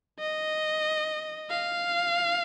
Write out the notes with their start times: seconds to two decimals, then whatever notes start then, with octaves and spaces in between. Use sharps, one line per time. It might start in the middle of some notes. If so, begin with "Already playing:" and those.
0.19 D#5
1.50 F5